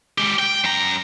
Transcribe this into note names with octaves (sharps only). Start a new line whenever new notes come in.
G#3 G4
G5
F#2 A#5